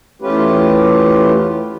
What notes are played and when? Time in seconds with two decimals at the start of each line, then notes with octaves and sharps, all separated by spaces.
0.22 E2 A3 C#4 F4 G4 B4